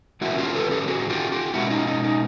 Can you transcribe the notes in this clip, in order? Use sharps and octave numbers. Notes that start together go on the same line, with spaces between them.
D#3 F#3 A#3 C#4 E4 F#4
F4 G4
A4 B4
G4 A4
F#4 G#4
F4 G4
F4 G4
B2 G#3 C#4 E4 F#4
D#4 F4
D#4
D#4